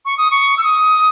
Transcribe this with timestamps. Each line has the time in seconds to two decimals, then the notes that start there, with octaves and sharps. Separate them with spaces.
0.05 C#6
0.18 D#6
0.31 C#6
0.57 E6
0.64 D#6